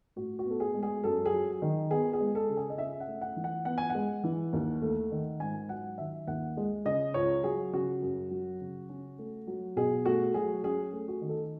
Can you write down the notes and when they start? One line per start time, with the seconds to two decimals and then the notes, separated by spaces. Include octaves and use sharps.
0.16 A2 F#4
0.39 F#4
0.45 B3
0.50 A4
0.60 G#4
0.74 G#3
0.83 G#4
1.04 F#2 A4
1.26 G#4
1.33 F#3
1.62 D#3
1.91 B3 G#4
2.13 G#4
2.20 G#3
2.35 A4
2.49 C#3
2.57 G#4
2.70 D#5
2.78 C#4 E5
3.00 F#5
3.07 A3
3.21 F#5
3.36 E3
3.44 F#5
3.65 B3 F#5
3.78 G#5
3.90 F#5
3.95 G#3
4.24 E3
4.53 D#2
4.82 A3
5.11 D#3
5.40 G#2 G#5
5.69 F#3 F#5
5.98 D#3 E5
6.27 D#2 F#5
6.57 G#3
6.85 C#3 D#5
7.14 C#2 C#5
7.44 F#3 G#4
7.73 C#3 F#4
8.02 F#2
8.31 F#3
8.61 C#3
8.89 C#4
9.19 A3
9.47 F#3
9.76 B2 G#4
10.06 A3 F#4
10.34 F#3 G#4
10.64 C#4 G#4
10.93 A3
11.08 F#4
11.21 D#3
11.29 A4